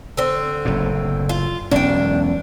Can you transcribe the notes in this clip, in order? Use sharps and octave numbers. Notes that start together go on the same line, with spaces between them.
D3 C4
F#1 A2
F4
E1 B1 C#4 D4 G5